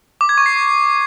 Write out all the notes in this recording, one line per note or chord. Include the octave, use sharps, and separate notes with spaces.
D6
G#6
C#6
C7